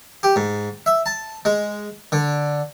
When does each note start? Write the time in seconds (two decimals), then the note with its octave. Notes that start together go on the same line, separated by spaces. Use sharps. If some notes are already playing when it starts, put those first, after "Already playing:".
0.23 G4
0.36 G#2
0.86 E5
1.06 A5
1.45 G#3
2.12 D3